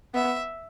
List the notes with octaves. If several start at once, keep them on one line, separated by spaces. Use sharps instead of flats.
B3 E5